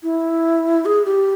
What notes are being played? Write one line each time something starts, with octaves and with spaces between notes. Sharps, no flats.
E4
G#4
G4